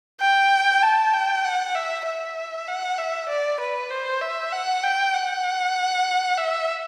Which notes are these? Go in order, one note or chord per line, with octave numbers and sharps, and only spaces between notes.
G5
A5
G5
F#5
E5
E5
F#5
E5
D5
B4
C5
E5
F#5
G5
F#5
E5